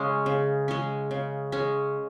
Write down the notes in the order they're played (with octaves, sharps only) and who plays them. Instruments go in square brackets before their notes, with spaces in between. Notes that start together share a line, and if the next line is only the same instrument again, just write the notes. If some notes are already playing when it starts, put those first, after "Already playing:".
Already playing: [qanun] C#3 G#3 C#4
C#3
G#3 C#4
C#3
G#3 C#4